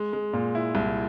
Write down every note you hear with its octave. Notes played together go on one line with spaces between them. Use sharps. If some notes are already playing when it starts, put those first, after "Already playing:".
Already playing: G#3
G#3
A#2
E4
C2